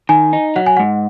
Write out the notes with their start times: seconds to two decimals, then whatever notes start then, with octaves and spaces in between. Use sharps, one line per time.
0.09 D#3 G#5
0.33 D#4
0.56 F#3 F#5
0.66 G#5
0.77 G#2 F#5